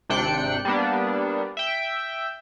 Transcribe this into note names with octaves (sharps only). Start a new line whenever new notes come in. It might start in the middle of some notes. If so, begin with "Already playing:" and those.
G#1 C3 D4 G5 F#6 C#7
G3 A#3 B3 D4
E5 G5